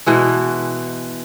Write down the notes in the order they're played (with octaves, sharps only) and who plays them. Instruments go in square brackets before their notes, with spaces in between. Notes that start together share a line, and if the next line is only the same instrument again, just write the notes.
[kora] B2 E3 G#3